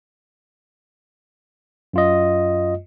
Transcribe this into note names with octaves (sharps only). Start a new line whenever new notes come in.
F#2 F4 D#5